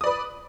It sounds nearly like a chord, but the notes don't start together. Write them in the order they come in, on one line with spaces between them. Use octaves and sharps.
D#6 D5 B4